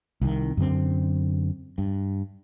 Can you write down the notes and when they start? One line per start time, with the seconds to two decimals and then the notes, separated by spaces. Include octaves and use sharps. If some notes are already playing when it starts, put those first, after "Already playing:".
0.21 C2 D#3
0.57 F#2 D3 C4
1.78 G2